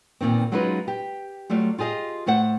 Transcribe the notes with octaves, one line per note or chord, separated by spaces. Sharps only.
E2 G2 A#2 D#3 C4
F#3 G#3 C#4 D#4 F4 B4
G4
F#3 G3 A3 F4
F4 G4 G#4 D#5 F5
A2 A3 C5 F#5